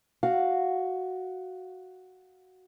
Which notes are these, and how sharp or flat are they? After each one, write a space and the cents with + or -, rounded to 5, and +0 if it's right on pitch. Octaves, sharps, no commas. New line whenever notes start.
F#4 +0 F5 +0